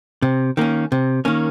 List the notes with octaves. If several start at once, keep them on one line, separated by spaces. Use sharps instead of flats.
C3
D#3 A#3 C#4
C3
D#3 A#3 C#4